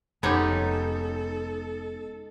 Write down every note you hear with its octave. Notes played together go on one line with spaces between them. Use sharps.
F1 G#3 B3 C#4 D#4 G4 A4